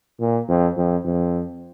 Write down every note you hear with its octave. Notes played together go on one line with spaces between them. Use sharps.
A#2
F2
F2
F2